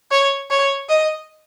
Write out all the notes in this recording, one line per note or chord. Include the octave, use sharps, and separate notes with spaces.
C#5
C#5
D#5